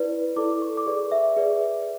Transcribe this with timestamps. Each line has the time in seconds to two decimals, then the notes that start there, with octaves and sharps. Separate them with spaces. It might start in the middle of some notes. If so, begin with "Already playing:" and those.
Already playing: E4 B4 D5
0.36 E4 A4 D5 D6
0.62 C#6
0.77 D6
0.86 G#4 B4 D5 C#6
1.12 E5
1.37 G#4 B4 D5